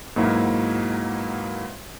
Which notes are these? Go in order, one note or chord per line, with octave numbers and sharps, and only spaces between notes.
G#2 B2 F#3 A#3 E4